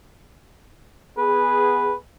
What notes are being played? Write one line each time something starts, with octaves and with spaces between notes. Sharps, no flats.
B3 G#4 B4